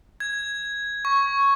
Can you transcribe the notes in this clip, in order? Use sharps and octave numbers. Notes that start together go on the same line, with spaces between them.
G#6
C#6